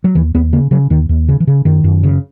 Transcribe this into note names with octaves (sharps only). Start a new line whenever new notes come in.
F#3
D#2 E3
D#2 B3
C#3 A#3
C#3 F#3
D#2 D#3
D#2
C#3
E3
C#3
F#2 D#3
F#2
C#3